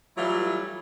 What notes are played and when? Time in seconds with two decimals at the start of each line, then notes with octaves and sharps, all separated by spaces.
0.17 E3 F#3 G3 A3 E4 F4